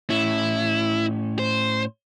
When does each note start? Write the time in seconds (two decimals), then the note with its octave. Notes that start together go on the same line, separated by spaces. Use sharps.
0.10 A2 C#4 E4
1.39 C5